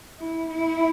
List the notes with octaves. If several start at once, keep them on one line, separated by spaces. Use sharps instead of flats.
E4
E4